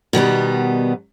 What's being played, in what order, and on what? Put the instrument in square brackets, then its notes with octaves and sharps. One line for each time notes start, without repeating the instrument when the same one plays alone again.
[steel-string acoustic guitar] B2 D#3 G3 B3